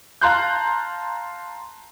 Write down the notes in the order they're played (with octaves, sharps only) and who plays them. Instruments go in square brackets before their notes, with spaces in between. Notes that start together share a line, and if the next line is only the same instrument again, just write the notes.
[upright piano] F5 A5 A#5 C6 F#6 G6